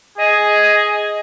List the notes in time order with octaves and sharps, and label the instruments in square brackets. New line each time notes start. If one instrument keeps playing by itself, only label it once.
[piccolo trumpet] G#4 [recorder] D#5